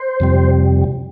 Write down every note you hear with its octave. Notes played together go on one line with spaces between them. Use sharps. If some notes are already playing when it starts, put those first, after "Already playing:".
Already playing: C5
F2 C3 G3